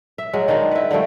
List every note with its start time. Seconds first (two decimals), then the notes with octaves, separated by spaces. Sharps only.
0.18 E5
0.33 F#3 G#3
0.48 D#3 G#3 D4 D#4
0.71 E4 B4
0.91 D3 F3 G3 A3